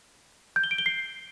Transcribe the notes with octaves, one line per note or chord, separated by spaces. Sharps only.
G6
G7
D7
G7
C7